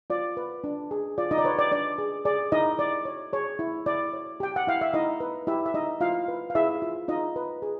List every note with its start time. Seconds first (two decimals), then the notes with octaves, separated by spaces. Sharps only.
0.10 F4 D5
0.37 B4
0.64 D4
0.91 G#4
1.18 F4 D5
1.31 D#4 D#5
1.38 D5
1.45 B4 C#5
1.59 D5
1.72 D4 D5
1.98 G#4
2.25 G#4 D5
2.52 D#4 E4 D#5
2.78 E4 D5
3.05 C#5
3.33 G#4 C#5
3.59 E4
3.86 E4 D5
4.13 C#5
4.40 G4 G5
4.56 F#5
4.67 E4 F5
4.81 E5
4.94 D#4 E4 D#5
5.20 B4
5.47 E4 G4 E5
5.66 E5
5.74 D#4 E4 D#5
6.01 E4 F4 F5
6.28 B4
6.50 F5
6.55 E4 G#4 E5
6.82 F4
7.08 D#4 F4 D#5
7.36 B4
7.62 G#4